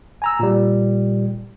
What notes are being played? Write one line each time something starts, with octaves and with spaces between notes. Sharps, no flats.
G#5 A#5 E6
A#2 G3